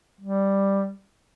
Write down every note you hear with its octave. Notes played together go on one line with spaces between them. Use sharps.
G3